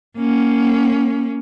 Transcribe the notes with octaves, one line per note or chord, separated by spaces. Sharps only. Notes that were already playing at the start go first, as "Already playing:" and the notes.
A#3 C#4